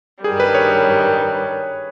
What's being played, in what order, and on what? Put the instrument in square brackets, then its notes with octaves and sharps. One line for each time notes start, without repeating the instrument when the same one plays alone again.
[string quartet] G2 D#3 G3 [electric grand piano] G#4
[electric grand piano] B4
C#5